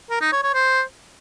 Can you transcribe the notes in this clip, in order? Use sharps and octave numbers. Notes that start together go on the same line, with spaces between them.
A#4
D#4
C#5
C#5
C5